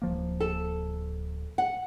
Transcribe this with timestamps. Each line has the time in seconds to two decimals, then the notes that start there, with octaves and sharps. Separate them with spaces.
0.02 D1 F3 A#3
0.40 A4
1.58 F#5